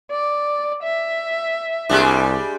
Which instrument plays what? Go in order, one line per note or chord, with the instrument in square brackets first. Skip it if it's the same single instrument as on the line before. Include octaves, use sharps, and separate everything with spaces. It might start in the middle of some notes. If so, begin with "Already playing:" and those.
[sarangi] D5
E5
[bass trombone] C2 [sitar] G3 G#3 D4